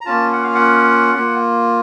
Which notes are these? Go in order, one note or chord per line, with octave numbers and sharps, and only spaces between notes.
A#5
A#3 C#4 F4 A5
F#5
F5
F#5
A#3 F4